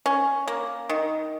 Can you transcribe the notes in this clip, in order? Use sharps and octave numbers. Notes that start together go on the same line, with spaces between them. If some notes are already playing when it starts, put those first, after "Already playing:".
C#4
A#3
D#3